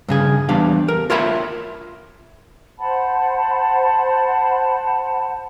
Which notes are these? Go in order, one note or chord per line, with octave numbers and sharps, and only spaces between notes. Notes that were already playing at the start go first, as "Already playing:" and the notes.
G2 C#3 G#4
E2 G3 D4 F5
A#4
F4 A#4 C#5 E5 B5
C5 F#5 A5 B5